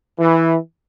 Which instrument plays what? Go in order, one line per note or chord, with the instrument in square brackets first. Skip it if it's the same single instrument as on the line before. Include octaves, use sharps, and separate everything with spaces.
[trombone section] E3